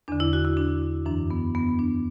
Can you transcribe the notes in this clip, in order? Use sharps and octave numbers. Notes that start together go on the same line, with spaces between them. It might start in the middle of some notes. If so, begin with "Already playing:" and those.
E2 D3 D4
E4
F#4
E4
D4
F#2 E3 D4
B3
B3
D4